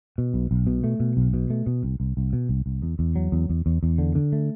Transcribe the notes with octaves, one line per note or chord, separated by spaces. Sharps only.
B2
B1
B1
B2
A3
B2
B1
B2
A3
B2
C2
C2
C2
B2
C2
C2
E2
E2
F#3
E2
E2
E2
E2
D3
D3
A3